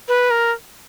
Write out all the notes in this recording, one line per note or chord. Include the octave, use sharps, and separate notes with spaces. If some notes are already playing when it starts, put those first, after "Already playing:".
B4
A#4